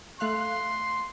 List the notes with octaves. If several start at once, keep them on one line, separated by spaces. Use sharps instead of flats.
A3 F5 C6 F#6